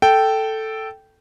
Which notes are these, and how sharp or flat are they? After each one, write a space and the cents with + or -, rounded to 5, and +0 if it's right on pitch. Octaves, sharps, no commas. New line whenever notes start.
A4 +0 G5 -10